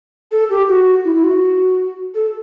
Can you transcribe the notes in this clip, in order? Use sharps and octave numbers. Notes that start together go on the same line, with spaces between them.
A4
G4
F#4
E4
E4
F#4
A4